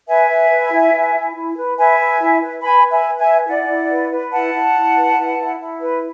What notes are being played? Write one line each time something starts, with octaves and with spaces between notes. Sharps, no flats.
B4 E5 G#5
B4
B4
E4
B4
E4
E4
B4
B4 E5 G#5
B4
E4
B4
B4 G#5 B5
B4
E5 G#5
B4
E5 G#5
B4
E4 D5 F#5
E4
B4
B4
E4 F#5 A5
E4
E4
B4
E4
E4
E4
B4